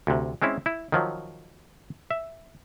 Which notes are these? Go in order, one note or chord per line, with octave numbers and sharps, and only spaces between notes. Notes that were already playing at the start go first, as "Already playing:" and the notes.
D2 C3
G#3 C4 C#4 E4
E4
D#3 F3 F#3
E5